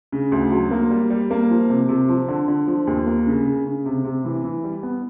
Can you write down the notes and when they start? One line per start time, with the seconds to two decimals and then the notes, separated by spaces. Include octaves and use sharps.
0.12 C#3
0.32 D2
0.52 F#3
0.71 A#3
0.91 G3
1.10 G3
1.31 A#3
1.50 F3
1.69 C3
1.89 C3
2.09 F3
2.28 D3
2.48 D3
2.67 F3
2.87 D#2
3.07 A#3
3.27 C#3
3.46 C#3
3.66 C#3
3.86 C3
4.05 C3
4.25 E3
4.44 E3
4.64 G3
4.83 B3